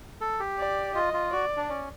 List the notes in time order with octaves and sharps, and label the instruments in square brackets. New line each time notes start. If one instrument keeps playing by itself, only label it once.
[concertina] A4
G4
[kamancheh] D5
[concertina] F4 [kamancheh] D#5
[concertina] F4
[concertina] F#4 [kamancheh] D5
[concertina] D4
C#4